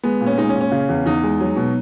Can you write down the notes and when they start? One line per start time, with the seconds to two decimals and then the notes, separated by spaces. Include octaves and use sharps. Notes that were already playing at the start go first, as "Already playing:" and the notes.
0.03 G#3 B3
0.21 A#2
0.26 C#4
0.38 G#3 D#4
0.49 C#4
0.55 A#2
0.61 C#4
0.72 C#3
0.89 E2
1.06 E2 D#4
1.24 G#3
1.41 F#3
1.56 B2